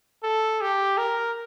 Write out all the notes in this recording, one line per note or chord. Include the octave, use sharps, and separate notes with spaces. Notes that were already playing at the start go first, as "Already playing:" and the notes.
A4
G4
A#4